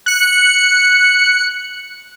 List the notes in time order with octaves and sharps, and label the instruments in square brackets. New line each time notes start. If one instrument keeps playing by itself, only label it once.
[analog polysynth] F#6 C#7